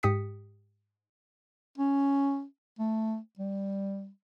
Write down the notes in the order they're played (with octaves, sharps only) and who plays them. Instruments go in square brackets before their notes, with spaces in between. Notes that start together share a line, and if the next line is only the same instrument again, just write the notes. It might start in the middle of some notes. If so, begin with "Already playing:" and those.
[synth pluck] G#2 G4 D#6 B6 C#7
[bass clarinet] C#4
A3
G3